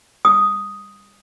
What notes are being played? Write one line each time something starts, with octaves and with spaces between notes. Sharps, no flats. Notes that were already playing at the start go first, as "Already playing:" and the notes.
D#6